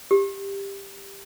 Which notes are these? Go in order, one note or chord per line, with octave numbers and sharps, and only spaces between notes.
G4